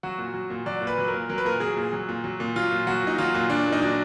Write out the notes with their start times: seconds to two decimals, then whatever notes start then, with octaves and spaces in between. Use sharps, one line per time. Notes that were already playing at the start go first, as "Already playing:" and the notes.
0.03 F#3 F#4
0.18 A#2
0.34 F#3
0.50 A#2
0.66 F#3 D5
0.81 A#2
0.87 B4
0.98 F#3
1.08 A#4
1.13 A#2
1.29 F#3 A#4
1.38 B4
1.45 A#2 A#4
1.60 F#3 G#4
1.77 A#2
1.93 F#3
2.09 A#2
2.24 F#3
2.40 A#2
2.56 F#3 F4
2.71 A#2
2.87 F#3 F#4
3.03 A#2 D#4
3.18 F#3 F4
3.34 A#2
3.50 F#3 D4
3.66 A#2
3.72 D#4
3.82 F#3 D4